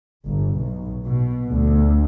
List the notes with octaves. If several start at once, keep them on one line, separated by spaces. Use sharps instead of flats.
G1
B1
B2
D2